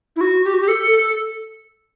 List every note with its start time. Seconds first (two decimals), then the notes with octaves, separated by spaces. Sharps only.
0.16 E4
0.21 F#4
0.45 G4
0.53 F#4
0.60 G4
0.68 A4
0.91 A4